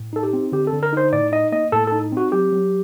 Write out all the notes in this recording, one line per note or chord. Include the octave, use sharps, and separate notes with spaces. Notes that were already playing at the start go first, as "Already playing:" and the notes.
Already playing: A2
D#4 A4
G4
C4
D3 G4
A4
D3
A#4
D#4 C5
A2 D5
D#4 D#5
A#3 D#5
A2 A4
D#4 A4
C4 F#4
F#3 G4
F#3